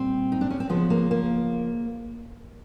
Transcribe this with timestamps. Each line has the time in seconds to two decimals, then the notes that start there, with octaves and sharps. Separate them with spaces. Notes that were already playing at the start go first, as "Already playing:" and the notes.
Already playing: A#2 G3 C4
0.32 D#4
0.41 D4
0.50 C#4
0.60 C4
0.69 C#3 F3 G#3 B3
0.90 A#3
1.11 A#3